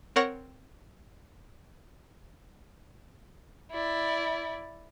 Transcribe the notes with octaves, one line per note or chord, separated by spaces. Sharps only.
C4 A#4 C#5 F#5 C#6 A#6
E4 D5